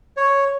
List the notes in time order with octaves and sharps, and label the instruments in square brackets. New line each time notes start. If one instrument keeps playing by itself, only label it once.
[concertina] C#5